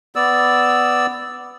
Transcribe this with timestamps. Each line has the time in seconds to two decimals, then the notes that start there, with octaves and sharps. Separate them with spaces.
0.15 B3 D5 E6